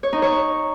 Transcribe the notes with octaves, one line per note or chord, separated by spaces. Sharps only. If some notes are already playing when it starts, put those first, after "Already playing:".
C#5
D#4
C#5